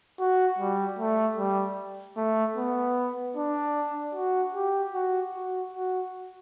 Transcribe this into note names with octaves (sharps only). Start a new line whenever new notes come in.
F#4
G3
A3
G3
A3
B3
D4
F#4
G4
F#4
F#4
F#4